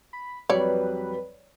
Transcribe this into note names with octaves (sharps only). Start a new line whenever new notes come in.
B5
F2 F#3 G3 B4 C#5 D5